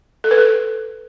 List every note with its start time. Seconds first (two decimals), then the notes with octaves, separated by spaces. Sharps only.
0.24 A4
0.31 B4
0.38 A4